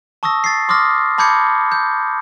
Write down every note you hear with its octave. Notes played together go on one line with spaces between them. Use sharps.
A5 C#6 D#6 E6 A#6
A6 C7
C6 D6 D#6 F6 A#6
A5 B5 D6 G6 G#6 C#7
G6